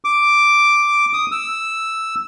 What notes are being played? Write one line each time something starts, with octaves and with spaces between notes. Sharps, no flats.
D6
D#6
E6